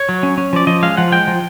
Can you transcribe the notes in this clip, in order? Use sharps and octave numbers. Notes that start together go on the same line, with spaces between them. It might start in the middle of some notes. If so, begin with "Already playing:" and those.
Already playing: C#5
F#3
C#4
C#4
F3 D5
F3 D#5
G#3 F5
F3 F#5
G#3 G5
F3